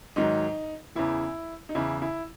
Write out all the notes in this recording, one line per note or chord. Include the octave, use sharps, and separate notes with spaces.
G#2 D#3 F#3 D#4
E2 C#3 E3 E4
D#4
E2 C#3 E3 E4
E4